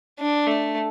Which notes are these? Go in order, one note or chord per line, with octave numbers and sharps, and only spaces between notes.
D4
A3